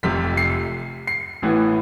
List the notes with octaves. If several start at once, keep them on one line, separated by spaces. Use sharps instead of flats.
F1 F2 C3 B6
C7
C7
A1 A2 E3 B3